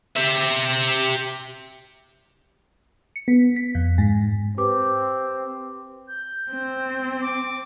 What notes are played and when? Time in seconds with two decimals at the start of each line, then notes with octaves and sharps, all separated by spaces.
0.16 G4 E5
3.16 C#7
3.28 B3
3.56 B6
3.75 F2
3.98 G#2
4.57 C4 G4 B4 D6
6.08 G6
6.51 C4
7.21 D6